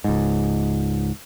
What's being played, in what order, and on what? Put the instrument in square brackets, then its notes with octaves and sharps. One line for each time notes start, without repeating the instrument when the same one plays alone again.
[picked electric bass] C#2 G#2